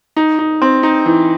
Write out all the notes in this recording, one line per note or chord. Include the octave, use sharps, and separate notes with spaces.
D#4
D#4
C4
D#4
E3